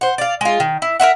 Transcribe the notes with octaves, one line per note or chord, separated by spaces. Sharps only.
C5 F#5
D5 F5
G#3 F4
D#3
E4
A#4 C5 E5 F#5